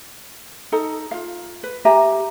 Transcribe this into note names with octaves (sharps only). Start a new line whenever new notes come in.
D#4 A4 A#5
F4 F5
B4
G4 E5 G#5 A#5